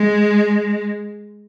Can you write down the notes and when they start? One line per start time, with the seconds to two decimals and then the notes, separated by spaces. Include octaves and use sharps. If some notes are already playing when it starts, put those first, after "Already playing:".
Already playing: G#3